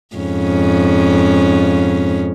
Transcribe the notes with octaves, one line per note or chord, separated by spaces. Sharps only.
F2 G#2 C#4